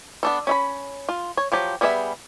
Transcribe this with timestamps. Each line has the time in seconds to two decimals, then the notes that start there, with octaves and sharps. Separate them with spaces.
0.23 B3 D4 A4
0.47 C#4 E5 B5
1.09 F4
1.37 C#5
1.52 F3 F#3 G4
1.81 G3 B3 G#4 D5 E5